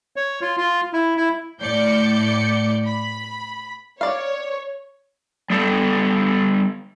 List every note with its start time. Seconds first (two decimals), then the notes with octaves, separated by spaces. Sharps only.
0.16 C#5
0.42 F4
0.57 F4
0.93 E4
1.17 E4
1.61 A2 D5 G6 C#7
2.85 B5
4.01 C#5 D5 F5
5.50 G3 B3 A4